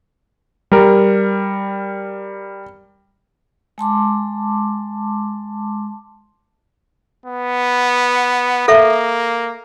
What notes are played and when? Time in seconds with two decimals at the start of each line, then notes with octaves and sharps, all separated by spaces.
0.72 G3 A#4
3.78 G#3 A5 C6 D6
7.25 B3
8.68 A#3 A4 E5